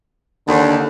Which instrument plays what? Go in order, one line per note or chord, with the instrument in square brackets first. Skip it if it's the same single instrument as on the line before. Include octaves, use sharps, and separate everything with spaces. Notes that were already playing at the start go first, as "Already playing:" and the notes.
[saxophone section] D#2 [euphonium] D3